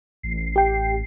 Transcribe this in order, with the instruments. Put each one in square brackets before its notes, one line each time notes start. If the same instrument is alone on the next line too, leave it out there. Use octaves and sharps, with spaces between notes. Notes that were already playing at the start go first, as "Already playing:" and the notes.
[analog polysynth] A1 C7
[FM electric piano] G4 G5